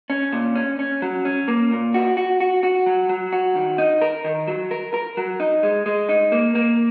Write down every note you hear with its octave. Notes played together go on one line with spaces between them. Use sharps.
C#4
A#2
C#4
C#4
F#3
C#4
A#3
A#2
F#4
F#4
F#4
F#4
F#3
F#3
F#4
D#3
D#4
A#4
D#3
F#3
A#4
A#4
F#3
D#4
G#3
G#3
D#4
A#3
A#3